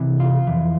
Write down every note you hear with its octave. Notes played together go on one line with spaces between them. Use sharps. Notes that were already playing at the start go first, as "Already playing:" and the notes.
Already playing: C2 C3 E3
F4
F2 E3